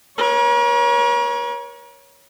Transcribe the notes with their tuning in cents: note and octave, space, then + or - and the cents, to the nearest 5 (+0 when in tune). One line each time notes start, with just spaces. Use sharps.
A#4 +45 C#5 +0